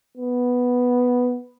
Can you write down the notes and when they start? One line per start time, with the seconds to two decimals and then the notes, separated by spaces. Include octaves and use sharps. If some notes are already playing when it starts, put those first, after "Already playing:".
0.18 B3